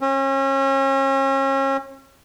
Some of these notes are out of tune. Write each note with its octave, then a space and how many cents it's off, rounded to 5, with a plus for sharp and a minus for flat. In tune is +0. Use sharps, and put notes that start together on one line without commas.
C#4 -35